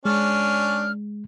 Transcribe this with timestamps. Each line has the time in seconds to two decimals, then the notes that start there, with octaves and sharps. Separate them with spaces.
0.05 G#3 C#4 D4 F6